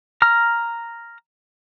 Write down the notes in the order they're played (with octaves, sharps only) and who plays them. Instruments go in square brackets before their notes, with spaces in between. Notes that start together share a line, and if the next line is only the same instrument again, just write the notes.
[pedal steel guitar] A#5 F6